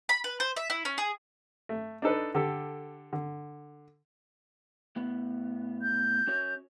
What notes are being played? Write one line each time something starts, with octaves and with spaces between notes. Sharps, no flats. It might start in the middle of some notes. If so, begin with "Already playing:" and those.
B5
B4
C5
E5
E4
C#4
G#4
A3
D4 D#4 A4 B4
D3 G4 A4
D3
A2 B3
G6
C#4 F#4 C#5